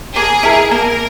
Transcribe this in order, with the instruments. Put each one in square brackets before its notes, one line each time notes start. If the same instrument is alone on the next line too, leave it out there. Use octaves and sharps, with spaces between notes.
[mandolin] A#3 [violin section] G#4
[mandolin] E4 A#4
[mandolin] A#3 [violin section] A#4